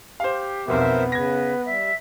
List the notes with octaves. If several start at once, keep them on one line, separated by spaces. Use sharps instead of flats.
G4 C5 F5
B1 F2 B2 B3 A#4 C5 E5
C#3 B4 G#6 A#6
G3 E5